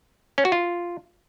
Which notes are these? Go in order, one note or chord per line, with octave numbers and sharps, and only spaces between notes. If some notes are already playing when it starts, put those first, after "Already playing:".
C#4
F#4
F4